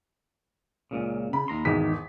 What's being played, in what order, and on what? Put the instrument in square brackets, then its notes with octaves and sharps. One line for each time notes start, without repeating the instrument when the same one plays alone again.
[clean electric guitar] C#2 A#2 C#3
[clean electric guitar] C#3 [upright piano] B5
[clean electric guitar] D#2 A#5 C6
[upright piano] G#1 E2 B6 [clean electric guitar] D#3 G#3